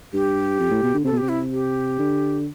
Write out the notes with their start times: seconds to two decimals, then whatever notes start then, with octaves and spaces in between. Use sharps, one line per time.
0.13 G2 G4
0.59 F2
0.71 A2
0.83 B2
0.94 D3
1.04 C3 A4
1.12 B2
1.17 C3 G4
1.29 E4
1.52 G4
1.99 D3